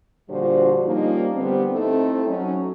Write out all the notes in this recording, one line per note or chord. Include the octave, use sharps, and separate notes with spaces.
A#2 D3 F3 G3 F#4 C5
F3 G3 A#3 C#4 D#4
D3 G3 B3 C4
A3 C4 D#4 E4 A4
F#3 C#4 D#4